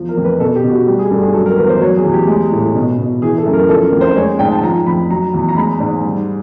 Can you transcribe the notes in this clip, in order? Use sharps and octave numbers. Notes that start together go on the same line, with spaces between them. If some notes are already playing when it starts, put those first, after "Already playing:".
Already playing: E2 F3
A#4
F2
B4
B2 A4
G4
B2
F#4
G3 G4
G#4
G2 A4
G#4
F#3 A4
A#4
E2 B4
C5
F#3 C#5
G#4
E2
G4
G#3
A2
B2
B2
E3 G#4
A4
F#2
A#4
F3 A4
A#4
F2
C5
G#3 C#5
G#2 G5
A5
F3 A#5
F2 B5
F#3 A#5
E2
A#5
G#3 B5
G#2
G3